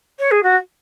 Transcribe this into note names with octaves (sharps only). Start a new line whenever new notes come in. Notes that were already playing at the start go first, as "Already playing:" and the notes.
C#5
G#4
F#4